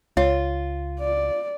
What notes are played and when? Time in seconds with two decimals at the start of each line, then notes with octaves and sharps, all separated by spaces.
0.17 C#2 F4 C#5
1.00 D5